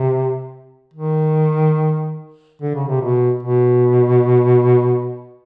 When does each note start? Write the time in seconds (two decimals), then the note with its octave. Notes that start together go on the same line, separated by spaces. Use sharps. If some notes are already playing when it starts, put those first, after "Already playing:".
Already playing: C3
0.93 D#3
2.62 D3
2.75 C#3
2.88 C3
3.01 B2
3.43 B2